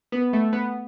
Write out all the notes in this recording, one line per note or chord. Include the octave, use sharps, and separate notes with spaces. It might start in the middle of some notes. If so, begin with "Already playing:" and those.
B3
A3
B3